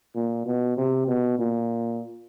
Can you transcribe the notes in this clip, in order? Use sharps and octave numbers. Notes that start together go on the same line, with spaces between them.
A#2
B2
C3
B2
A#2